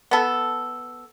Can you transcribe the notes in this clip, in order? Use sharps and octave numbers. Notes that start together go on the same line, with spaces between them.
B3 A4